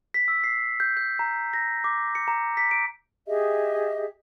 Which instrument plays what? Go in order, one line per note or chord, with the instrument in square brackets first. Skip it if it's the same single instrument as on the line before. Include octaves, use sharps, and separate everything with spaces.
[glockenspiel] B6
E6
C7
G6
G6
A#5
A#6
D6
C#7
A#5
B6
D7
[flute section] G4 G#4 D#5 E5